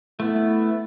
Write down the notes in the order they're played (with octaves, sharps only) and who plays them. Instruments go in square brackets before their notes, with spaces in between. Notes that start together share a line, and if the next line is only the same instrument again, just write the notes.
[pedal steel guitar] A3 B3 [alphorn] E4